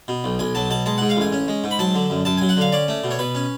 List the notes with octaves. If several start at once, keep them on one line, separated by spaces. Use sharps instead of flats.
B2
B1
B1 G#5
F#3 A5
B2 A5
G#3 A5
G#2 F#5
F5
A1 G#5
C#4
G#3
G#2
B5
F#3 A5
D3
F#2
F#2 A5
F#3 G#5
F#5
D3 F5
C#4 D5
A3
B2
C#5
B2 B4
C#4